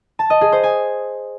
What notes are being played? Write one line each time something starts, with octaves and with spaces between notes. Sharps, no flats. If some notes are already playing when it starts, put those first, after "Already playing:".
A5
D#5
G#4
C5
G#5